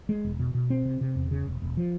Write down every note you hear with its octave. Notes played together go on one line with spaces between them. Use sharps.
G#3
E1
B2
B2
C4
C3
C3
E2
C#3
E1
E1
F3